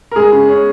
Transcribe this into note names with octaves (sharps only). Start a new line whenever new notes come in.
A#4
G#3 G#4
C#3
C#4